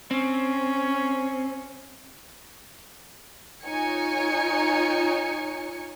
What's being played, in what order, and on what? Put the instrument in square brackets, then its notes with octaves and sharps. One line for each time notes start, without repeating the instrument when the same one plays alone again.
[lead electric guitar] C4 [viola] C#4
[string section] D#4 F4 C#5 G#5 C#7